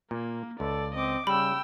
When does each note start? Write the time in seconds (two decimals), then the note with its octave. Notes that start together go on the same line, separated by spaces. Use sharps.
0.11 A#2 A#3
0.60 C#2 A4 D5
0.95 C4 D#5 D6
1.27 C#3 G3 G5 B5 E6